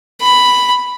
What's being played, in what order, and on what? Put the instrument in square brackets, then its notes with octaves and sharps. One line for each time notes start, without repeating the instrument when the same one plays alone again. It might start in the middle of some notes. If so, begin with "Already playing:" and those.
[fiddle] B5